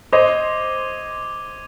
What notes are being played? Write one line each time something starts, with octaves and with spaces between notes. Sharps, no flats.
C5 D#5 D6 G#6 D#7 G7